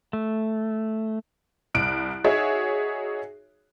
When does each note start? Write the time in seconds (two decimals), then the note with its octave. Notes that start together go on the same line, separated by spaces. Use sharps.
0.13 A3
1.74 C2 F#6 D7
2.24 D#4 F#4 G#4 C#5 E5